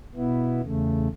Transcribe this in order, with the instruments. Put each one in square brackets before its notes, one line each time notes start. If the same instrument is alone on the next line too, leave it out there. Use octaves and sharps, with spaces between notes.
[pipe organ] B2 B3 E4
E2 C#3 A3